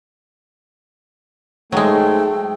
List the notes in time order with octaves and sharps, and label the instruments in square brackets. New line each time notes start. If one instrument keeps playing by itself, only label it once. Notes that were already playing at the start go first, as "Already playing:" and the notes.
[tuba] G#2 [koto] F#3 G#3 [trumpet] A3 [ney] G5